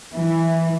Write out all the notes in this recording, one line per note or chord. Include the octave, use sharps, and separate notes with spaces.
E3